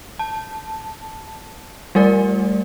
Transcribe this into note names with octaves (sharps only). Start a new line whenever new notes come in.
A5
G3 A3 A#4 D5